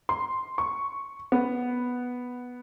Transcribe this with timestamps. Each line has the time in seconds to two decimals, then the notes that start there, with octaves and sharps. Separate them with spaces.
0.09 C6
0.58 C#6
1.32 B3